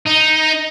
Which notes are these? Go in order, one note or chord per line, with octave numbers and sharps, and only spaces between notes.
D#4